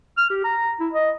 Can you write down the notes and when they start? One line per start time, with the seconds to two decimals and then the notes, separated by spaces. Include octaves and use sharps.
0.17 F6
0.30 G4
0.44 A#5
0.80 E4
0.93 D#5